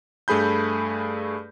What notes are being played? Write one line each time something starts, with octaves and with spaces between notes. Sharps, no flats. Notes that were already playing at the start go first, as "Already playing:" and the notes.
G2 A3 G#4 B5 G6